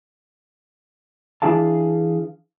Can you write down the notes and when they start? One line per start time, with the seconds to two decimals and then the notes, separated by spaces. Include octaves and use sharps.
1.42 E3 D4 E4 G#4 F5 A5